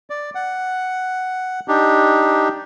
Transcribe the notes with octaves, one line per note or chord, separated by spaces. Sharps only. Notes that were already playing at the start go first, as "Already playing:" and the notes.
D5
F#5
D4 D#4 G4